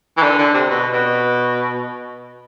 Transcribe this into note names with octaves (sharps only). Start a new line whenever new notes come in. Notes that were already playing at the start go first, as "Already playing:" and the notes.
E3
D3
D3
C3
B2
B2